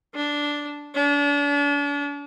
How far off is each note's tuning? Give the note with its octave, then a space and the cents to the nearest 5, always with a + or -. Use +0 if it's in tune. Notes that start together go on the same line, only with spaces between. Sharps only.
D4 -5
D4 -40